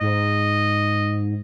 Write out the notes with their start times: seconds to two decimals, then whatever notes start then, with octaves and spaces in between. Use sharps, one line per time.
0.01 G#2 D#5